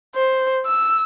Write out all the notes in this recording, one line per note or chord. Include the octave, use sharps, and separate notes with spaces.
C5
E6